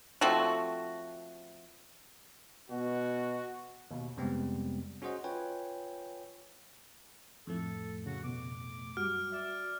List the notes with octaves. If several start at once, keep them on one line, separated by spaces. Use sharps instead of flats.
F3 A3 C4 F#4
B2 F#4
D#2 B2
F2 C3 G3 G#3 B3 C4
C#4 F#4 G#4 C5 D#5 F#5
F4 B4 C#5 G5 G#5
F2 A2 A3 A4
C#3 F#4
B2 D6
F#2 G3 F#4 F6
D5 E5 E6